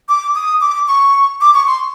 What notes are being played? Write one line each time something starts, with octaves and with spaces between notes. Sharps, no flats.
D6
D#6
D6
C#6
D6
C#6
C6